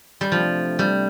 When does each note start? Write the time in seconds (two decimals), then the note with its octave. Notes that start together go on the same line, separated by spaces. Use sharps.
0.21 G3
0.32 C3 F3 A3 D4
0.79 G3